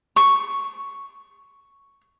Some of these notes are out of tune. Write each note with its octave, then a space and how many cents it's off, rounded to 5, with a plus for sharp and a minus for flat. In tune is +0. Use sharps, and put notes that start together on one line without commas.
C#6 +0